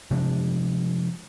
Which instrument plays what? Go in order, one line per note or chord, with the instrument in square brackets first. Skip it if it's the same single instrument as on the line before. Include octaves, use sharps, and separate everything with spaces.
[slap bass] C3 F3 G#3 D4